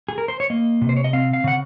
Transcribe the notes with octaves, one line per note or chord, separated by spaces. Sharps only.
G#4
A#4
C5
C#5
A#3 D#5
C3
C5
C#5
D#5
C4 F5
F5
C#3 F#5